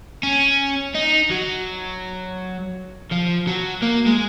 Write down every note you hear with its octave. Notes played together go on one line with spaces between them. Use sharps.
C#4
D#4
F#3
F3
F#3
A#3
G#3